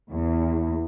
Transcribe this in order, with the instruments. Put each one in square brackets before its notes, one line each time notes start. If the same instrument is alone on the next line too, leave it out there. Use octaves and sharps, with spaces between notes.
[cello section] E2